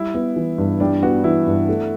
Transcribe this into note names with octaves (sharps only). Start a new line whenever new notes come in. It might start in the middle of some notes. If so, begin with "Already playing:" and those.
Already playing: G3 E4
B3
E3
G2
G3 D4
B3 F#4
E3 E4
G2
A3